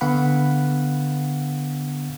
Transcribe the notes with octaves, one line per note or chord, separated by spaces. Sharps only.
D3 B3 F5 F#5 B5